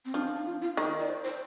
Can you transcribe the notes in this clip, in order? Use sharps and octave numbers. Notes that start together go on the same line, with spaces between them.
C4
F3 D4
D4
D#4
F4
F4
D#3 A#4
D5
C5
C5